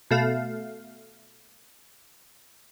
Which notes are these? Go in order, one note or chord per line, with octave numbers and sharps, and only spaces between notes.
B2 A3 F5